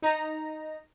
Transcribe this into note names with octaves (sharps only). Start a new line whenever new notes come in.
D#4 A#5